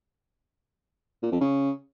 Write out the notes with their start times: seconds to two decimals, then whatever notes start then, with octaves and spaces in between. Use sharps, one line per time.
1.23 A#2
1.32 F2
1.41 C#3